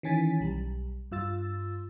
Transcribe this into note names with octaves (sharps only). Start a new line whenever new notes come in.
D#3 E3 C#4 G#5 A6 B6
B1 G3
G2 F4 E6 A6